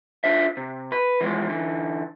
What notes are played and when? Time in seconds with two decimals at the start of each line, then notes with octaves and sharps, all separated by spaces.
0.24 D4 F4 C5 E5
0.57 C3
0.92 B4
1.21 E3 F3 G#3
1.49 D3 E3